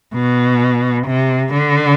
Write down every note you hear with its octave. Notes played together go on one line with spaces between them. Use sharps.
B2
C3
D3